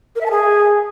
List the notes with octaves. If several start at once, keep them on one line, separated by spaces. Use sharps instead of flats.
A#4
E5
A5
G#4